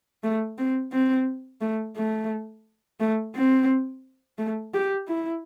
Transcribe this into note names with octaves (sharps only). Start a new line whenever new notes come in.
A3
C4
C4
A3
A3
A3
C4
A3
G4
E4